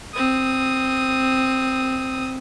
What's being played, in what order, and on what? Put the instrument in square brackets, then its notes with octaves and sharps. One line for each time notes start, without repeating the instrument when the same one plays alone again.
[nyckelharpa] C4 D#6